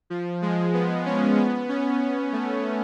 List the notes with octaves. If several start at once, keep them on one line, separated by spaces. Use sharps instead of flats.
F3
G#3
B3
C#4
B3
C#4
B3
A3